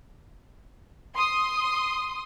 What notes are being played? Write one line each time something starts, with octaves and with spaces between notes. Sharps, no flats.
C6 D#6